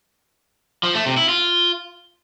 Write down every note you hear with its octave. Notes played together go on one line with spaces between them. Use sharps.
F3
A3
C3
E4
F4